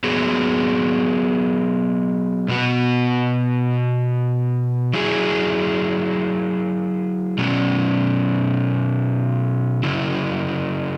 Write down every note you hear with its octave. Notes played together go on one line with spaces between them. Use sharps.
F#3 B3 G#4
B2 B3 F#4
F#3 E4 G#4
B2 F#3 C#4
C#3 F#3 E4